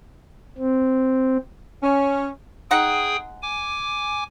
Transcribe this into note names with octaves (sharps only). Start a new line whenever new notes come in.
C4
C#4
G#3 D#4 G#4 F#5 G5 D#6
G#5 D6